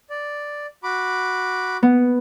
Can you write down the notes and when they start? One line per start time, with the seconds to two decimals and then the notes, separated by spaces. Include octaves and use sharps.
0.10 D5
0.83 F#4 B5 D6
1.83 B3